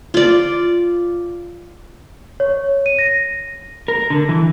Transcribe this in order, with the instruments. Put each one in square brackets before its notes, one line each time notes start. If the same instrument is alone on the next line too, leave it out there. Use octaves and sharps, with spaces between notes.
[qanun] F4 D5
[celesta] C#5
D#7
A#6
[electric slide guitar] A#4
D3
E3